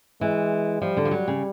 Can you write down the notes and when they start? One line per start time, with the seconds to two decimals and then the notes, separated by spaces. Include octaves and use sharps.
0.21 E3 G#3
0.81 F3 G3
0.97 D3
1.05 F3
1.11 F#3
1.28 C#3